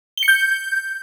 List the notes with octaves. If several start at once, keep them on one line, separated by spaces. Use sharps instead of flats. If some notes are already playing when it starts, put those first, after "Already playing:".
G7
C#7
G6